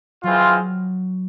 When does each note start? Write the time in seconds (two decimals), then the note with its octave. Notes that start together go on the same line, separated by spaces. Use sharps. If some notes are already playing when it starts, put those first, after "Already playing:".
0.23 E3 F#3 G#3 C4 F4